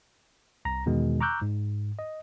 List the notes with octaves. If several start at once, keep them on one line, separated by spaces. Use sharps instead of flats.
C2 A#5 A#6
E2 B2 D#3 G#3
A#5 C#6 D6 E6 F#6 G6
G#2
D#5